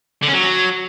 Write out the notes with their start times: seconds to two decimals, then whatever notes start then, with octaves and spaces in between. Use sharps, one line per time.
0.22 D3
0.28 C#4
0.33 F#3